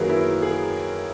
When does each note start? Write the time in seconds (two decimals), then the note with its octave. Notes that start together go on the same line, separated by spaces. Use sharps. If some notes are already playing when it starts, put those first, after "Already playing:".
Already playing: F#2 D#3 F#3 A#3 G#4 A#4 B4
0.09 E4
0.42 G#4